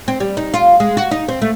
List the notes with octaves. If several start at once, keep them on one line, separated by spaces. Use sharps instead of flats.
C4
G3
D#4
F4
G#3
F#4
D#4
C4
A3